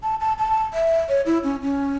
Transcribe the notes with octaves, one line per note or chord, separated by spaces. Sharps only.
A5
A5
A5
E5
C#5
E4
C#4
C#4